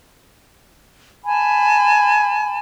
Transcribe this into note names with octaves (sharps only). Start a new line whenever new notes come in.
G#5 A5 B5